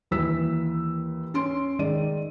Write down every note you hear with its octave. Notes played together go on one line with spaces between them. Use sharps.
D#2 E3 B4 E6 B6
C#4 C6 D7
D#3 G#3 D5 D#7